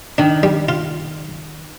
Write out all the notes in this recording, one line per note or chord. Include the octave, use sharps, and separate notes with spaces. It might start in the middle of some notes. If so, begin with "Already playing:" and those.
D#3 D4
G3
F4